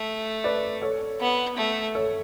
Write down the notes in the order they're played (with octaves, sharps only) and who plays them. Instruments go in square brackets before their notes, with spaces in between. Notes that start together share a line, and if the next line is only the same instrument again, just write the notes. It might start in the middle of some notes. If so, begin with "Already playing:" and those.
Already playing: [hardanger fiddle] A3
[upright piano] B4 D5
A4 C#5
[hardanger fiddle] B3
A3
[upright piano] A4 C#5